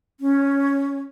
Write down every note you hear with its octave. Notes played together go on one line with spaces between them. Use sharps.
C#4